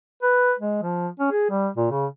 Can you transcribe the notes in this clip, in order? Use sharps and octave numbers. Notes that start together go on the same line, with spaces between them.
B4
G#3
F3
C#4
G#4
G3
A#2
C#3